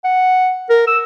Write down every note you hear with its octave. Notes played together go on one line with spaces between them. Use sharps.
F#5
A#4
E6